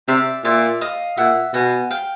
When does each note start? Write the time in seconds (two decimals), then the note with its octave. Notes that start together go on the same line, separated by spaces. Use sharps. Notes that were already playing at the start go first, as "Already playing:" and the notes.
0.08 C3 D5 E5
0.44 A#2 D5 E5
0.81 D#5 F5
1.17 A#2 E5 F#5
1.54 B2 F#5 G#5
1.90 F5 G5